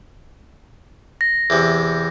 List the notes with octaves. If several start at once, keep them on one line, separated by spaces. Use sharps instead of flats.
A#6
E2 C3